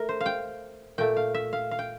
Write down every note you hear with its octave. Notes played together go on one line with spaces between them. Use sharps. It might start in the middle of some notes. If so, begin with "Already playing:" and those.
Already playing: A3 A#4
C5
F5
G5
A#2 A3 G5
F5
E5
F5
F5
G5